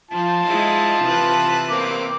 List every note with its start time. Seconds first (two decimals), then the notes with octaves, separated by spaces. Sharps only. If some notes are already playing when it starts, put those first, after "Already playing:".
0.11 F3 F4 A5
0.45 G#3 D#4 E4
1.03 C3 E3 B4
1.70 A#3 C4 D6